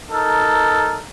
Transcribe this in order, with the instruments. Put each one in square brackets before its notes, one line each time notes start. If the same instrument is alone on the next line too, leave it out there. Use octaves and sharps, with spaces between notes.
[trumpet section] D#4 A4 A#4